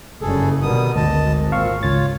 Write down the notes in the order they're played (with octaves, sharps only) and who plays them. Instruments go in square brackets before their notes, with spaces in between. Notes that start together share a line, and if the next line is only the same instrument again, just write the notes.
[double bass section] F#1 G2 C#3 [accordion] G#4 A4
[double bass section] B2 D3 D#3 [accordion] G3 B3 D#6
[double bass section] G#1 [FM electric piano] D2 [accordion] D#5 A5
[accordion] A#2 C4 [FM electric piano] F5 C#6
[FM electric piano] C#2 A6 [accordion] F4 C#5